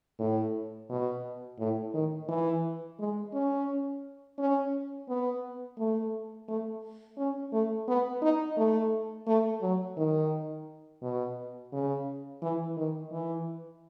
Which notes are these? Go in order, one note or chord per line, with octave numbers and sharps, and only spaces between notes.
A2
B2
A2
D#3
E3
G#3
C#4
C#4
B3
A3
A3
C#4
A3
B3
D#4
A3
A3
F#3
D#3
B2
C#3
E3
D#3
E3